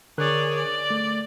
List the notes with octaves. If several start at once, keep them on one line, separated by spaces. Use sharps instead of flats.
D3 G#4 A#4 C#5 D5 F#6
D5
A3